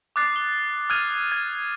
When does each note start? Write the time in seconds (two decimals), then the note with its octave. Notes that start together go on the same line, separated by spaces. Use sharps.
0.16 D6 D#6 F#6 A6 C7
0.36 G7
0.89 D#6 F6 F#6 G#6 D#7 F7
1.32 G#6